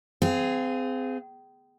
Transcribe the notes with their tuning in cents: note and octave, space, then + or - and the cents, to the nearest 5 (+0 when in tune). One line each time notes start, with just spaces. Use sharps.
C4 -30 G#4 +0 F5 +0